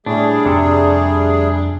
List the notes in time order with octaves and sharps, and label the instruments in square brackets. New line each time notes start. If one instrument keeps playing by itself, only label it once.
[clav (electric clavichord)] A2 [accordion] G3 A3 G#4 [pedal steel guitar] D4
[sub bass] F2 [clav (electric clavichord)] C3 A4